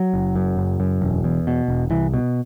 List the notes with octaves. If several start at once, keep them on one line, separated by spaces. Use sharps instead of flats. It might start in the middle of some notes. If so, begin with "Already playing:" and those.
Already playing: F#3
F#1
F#2
F#1
F#2
E1
E2
B2
E1
C2 E3
B2